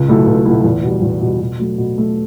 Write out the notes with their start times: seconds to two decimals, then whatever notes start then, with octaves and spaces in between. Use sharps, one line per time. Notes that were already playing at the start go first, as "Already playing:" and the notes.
Already playing: C#2
0.08 B2 F#3 A3 E4
0.26 C#2
0.45 B2 F#3 A3 E4
0.64 E2
0.83 B2 G3
1.02 E2
1.21 B2 G3
1.40 B2
1.60 F#3 A3
1.78 B2
1.97 F#3 A3